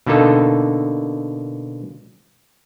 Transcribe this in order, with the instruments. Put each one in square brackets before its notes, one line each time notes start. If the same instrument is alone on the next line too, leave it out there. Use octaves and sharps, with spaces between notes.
[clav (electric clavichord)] B2 D3 A#3 D#4 A4